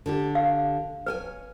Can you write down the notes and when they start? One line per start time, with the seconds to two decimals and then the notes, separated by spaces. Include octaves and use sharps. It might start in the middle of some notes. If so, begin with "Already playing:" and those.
0.06 D3 D4 G4
0.35 F5
1.06 B4 C#5 G5 G#5